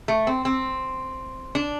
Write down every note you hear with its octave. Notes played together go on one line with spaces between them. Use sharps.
A3
C4
C4
D4